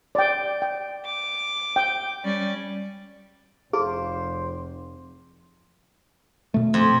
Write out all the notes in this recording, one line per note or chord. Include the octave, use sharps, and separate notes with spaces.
D5 G5
G5
D6
G5
G3 C#4 D5
F1 F4 G#4 C5
B2 A3
F2